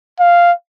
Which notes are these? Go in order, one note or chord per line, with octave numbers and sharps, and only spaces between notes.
F5